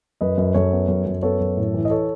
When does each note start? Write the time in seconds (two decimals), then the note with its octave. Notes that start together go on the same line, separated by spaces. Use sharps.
0.21 F#2 B4 D#5
0.38 F#2
0.54 F#2 A4 C#5
0.72 B3
0.88 F#2
1.06 F#2
1.23 B3 A4 C#5
1.40 F#2
1.57 A2
1.74 E3
1.85 D#5
1.90 A4 C#5